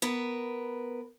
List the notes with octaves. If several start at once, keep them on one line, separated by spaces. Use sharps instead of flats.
B3 A#4 B4